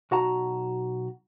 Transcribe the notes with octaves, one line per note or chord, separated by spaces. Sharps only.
B1 F#4 F#5 A5 A#5